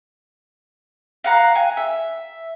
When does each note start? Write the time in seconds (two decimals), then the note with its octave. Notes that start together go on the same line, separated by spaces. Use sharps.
1.24 F5 F#5 A#5 F#6
1.55 G#5
1.77 E5